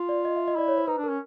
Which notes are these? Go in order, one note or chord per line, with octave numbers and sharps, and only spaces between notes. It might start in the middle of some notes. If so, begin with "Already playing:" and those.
Already playing: F4
D5
D#5
E5
D#5
E4 D5
C#5
C5
D#4 B4
D4
A#4
C#4